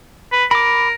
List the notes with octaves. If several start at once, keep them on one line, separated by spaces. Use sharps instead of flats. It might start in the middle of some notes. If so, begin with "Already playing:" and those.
B4
A#4 B5 D6